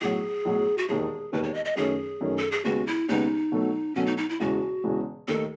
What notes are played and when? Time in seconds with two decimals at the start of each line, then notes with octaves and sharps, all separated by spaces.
0.01 B1 A2 F#3 G#4
0.45 B1 A2 F#3
0.78 F#4
0.88 E1 D#2 D#3 G#4
1.33 E1 D#2 D#3 B4
1.43 C#5
1.54 D#5
1.65 D#5
1.76 F#2 D#3 A3 C#4 G#4
2.21 F#2 D#3 A3 C#4
2.38 A4
2.52 G#4
2.64 D#2 C#3 G#3 B3 F#4
2.87 E4
3.09 D#2 C#3 G#3 B3 D#4
3.52 B2 F#3 A3
3.95 B2 F#3 A3 C#4
4.06 D#4
4.17 D#4
4.29 E4
4.40 E1 E2 C#3 E3 G#3 F#4
4.84 E1 E2 C#3 E3 G#3
5.28 D#2 D#3 A3 D#4 A4